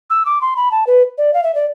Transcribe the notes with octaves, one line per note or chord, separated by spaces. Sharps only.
E6
D6
C6
B5
A5
B4
D5
F5
E5
D5